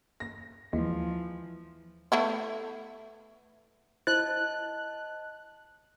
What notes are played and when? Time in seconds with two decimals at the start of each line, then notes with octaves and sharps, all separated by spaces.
0.20 A#6
0.73 D#2 E3 F3 G#3
2.12 A3 B3 E4
4.07 E4 C5 D#5 A5 F#6 A6